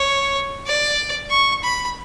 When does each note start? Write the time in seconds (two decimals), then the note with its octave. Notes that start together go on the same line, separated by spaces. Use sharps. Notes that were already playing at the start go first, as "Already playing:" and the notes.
Already playing: C#5
0.66 D5
1.30 C#6
1.63 B5